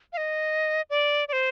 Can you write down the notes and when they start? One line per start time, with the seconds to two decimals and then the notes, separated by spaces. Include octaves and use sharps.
0.13 F5
0.17 D#5
0.90 D5
1.28 D5
1.33 C5